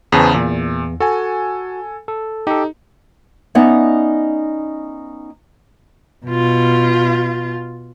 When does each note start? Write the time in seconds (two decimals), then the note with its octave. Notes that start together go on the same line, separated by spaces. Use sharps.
0.12 E2 C#3 G#4 B4 C5 A5
0.34 E2 A#2
1.00 F#4 A4 G#5
2.08 A4
2.47 D#4 G4 A4
3.55 B3 C#4 D#4 D5 E5
6.26 B2 F4